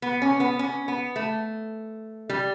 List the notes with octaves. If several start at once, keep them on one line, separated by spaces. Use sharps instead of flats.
B3
C#4
B3
C#4
B3
A3
G3